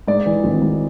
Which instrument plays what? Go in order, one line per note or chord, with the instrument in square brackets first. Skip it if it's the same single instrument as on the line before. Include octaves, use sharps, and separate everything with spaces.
[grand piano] G#2 D5
E3
G#1
G#2